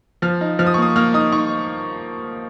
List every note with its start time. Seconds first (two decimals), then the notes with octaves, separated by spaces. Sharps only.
0.22 F3 F6
0.41 D#4
0.59 F3 F6
0.67 D#6
0.74 C#6
0.78 A#3 D#6
0.96 A#3 F6
1.14 D#4 D#6
1.32 D#4 C#6